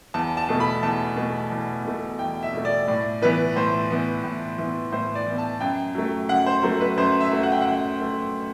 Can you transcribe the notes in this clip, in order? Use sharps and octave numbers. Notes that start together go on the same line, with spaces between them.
E2 A5
A5
B2 A3
B5
E2 A5
B2 A3
E2
B2 A3
E2 G5
E5
B2 A3
D5
A2 D5
E3 B3 B4
A2 C5
E3 B3
A2
E3 B3
A2 C5
D5
E3 B3
A5
F#2 G5
F#3 A3
F#2 F#5
C5
F#3 A3 C5
B4
F#2 C5
E5
F#3 A3
F#5
G5
F#2 F#5
F#3 A3